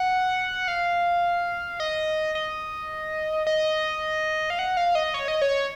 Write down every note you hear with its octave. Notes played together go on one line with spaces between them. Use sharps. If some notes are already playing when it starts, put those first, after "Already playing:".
Already playing: F#5
F5
D#5
D#5
D#5
F5
F#5
F5
D#5
C#5
D#5
C#5